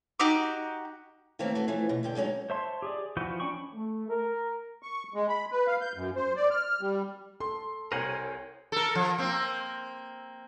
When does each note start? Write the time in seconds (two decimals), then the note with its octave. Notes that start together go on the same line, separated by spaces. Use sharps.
0.19 D#4 F#4 G4 D6
1.39 D#3 E3 A3 A#3 C4 C#4
1.55 A3 F#4
1.68 E3 F3 A3 C#4
1.89 B2
2.03 E2 D3 G5
2.15 D3 F#3 G#3 C#4 D#4
2.50 C5 C#5 E5 A5 C6
2.82 G4 G#4 D5
3.17 E3 F3 F#4 B4 G6
3.40 C#4 D4 G5 B5 C#6
3.73 A3
4.09 A#4
4.83 C#6
5.14 G#3
5.28 B5
5.52 B4
5.67 F5
5.81 G6
5.96 F#2
6.16 C5
6.36 D5
6.51 F6
6.81 G3
7.40 A4 C6
7.92 C2 A#4 C5 C#5 F#5 G#5 D#7
8.72 A4 A#4
8.95 F3
9.18 A#3 C4